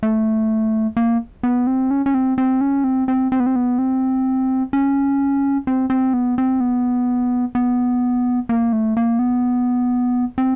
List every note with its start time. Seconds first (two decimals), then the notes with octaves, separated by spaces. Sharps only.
0.03 A3
0.97 A#3
1.43 B3
1.67 C4
1.91 C#4
2.06 C#4
2.14 C4
2.38 C4
2.61 C#4
2.84 C4
3.08 C4
3.32 C4
3.40 B3
3.46 C4
3.56 B3
3.79 C4
4.73 C#4
5.67 C4
5.90 C4
6.14 B3
6.38 C4
6.60 B3
7.55 B3
8.49 A#3
8.73 A3
8.97 A#3
9.19 B3
10.38 C4